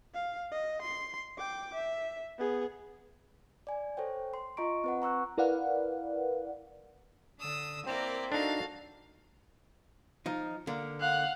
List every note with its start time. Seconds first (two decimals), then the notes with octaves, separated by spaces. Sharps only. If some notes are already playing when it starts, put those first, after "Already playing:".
0.14 F5
0.51 D#5
0.82 C6
1.38 G5 D6
1.75 E5
2.38 B3 G#4
3.67 D5 G#5
3.97 A4 C5 C#5 G5
4.34 C6
4.57 F4 D#5 A#5 C#6 D7
4.84 C4 B4 F#5
5.02 A#5 C#6 E6 F#6
5.38 E4 A#4 B4 D5 F5 F#5
7.40 D3 D4 D#6 E6
7.87 A#3 C4 E4 A#4 D5
8.32 D4 D#4 F#4 A4 F5
10.26 F3 D#4
10.67 D3 A#3
11.01 F5 F#5 F#6